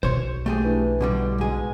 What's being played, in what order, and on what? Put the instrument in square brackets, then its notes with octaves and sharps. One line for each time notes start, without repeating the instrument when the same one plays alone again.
[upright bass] B1 [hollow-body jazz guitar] C5 C#5
[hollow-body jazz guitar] A3 G4 G#4
[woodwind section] E3 D4
[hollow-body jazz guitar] B2 D3 G3
[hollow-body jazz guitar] G#2 G#4 [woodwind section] B2 G#3